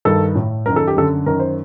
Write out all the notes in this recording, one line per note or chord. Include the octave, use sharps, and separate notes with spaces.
G2 D#3 A4
A2
F#2 D#3 A#4
A4
G4
F#2 D3 A4
F#2 D#3 A#4
C5